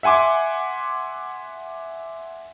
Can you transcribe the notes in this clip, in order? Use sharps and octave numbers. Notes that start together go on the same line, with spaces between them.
E5 F#5 G#5 C6 D6